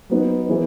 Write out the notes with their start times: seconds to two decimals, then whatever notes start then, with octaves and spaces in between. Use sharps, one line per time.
0.10 F#3 B3 D#4
0.49 E3 B3 E4 G#4